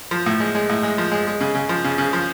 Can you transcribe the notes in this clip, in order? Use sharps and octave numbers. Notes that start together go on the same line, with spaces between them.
F3
A2
G#3
G#3
A2
G#3
F3
G#3
G#3
C#3
C#3
F3
C#3
C#3
F3